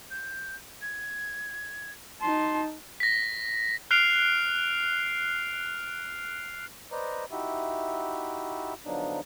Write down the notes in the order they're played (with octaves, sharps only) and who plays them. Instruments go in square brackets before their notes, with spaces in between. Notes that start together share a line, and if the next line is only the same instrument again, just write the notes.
[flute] G6
G#6
[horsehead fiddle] D#4 A5 [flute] C6
[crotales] A#6 B6
F6 F#6 C7 D7 F7
[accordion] B4 C5 D5 D#5 A#5
D#4 E4 F#4 G4 E5
D3 F3 F#3 B3 D4 D#4